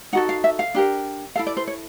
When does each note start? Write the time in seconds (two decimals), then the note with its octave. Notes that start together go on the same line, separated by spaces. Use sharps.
0.13 D#4 F#4 A4 F#5
0.29 F5
0.44 E5
0.59 F5
0.74 D4 G4 A#4
1.36 E4 A4 F5
1.47 D5
1.57 C5
1.68 C#5